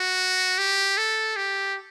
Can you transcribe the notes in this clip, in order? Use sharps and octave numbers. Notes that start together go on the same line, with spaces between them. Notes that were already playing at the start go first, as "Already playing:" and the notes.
Already playing: F#4
G4
A4
G4